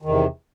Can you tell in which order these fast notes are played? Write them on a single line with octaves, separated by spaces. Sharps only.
D#3 E2 C3